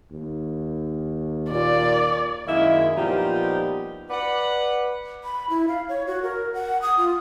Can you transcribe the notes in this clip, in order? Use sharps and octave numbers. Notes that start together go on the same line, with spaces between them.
D#2
A#2 D5
F#2 D#3 G#3 A#3 E4 E5
A#2 F3 G3 B3 D#4 G4
B4 D5 F#5
B5
E4
F5
C#5
F#4
A#4
F#5
D#6
F4